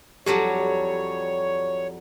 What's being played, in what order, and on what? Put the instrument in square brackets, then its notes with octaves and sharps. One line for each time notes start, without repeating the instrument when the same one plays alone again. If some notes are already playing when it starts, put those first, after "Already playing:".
[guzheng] F2 F#3 G3 [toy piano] G4 [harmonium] C#5